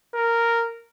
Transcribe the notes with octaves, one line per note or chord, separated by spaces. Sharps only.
A#4